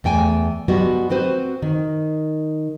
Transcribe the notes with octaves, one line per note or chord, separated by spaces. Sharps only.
E2 A3 G5 G#5
G3 G#3 B3 F#4
C4 F#4 B4 C5
D#3